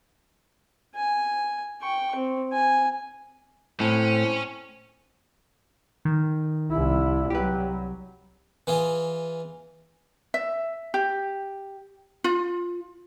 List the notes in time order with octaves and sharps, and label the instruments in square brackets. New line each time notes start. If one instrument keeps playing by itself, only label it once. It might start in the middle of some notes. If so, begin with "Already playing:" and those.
[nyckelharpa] G#5
G5 C#6
C4
G#5
[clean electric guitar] A2 [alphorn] C4 [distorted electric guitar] C#4
[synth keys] D#3
[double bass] C2 E4
[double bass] C2 F#3 [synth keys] G4 B4
[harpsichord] E3 F4 G#4
[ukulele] E5
G4
F4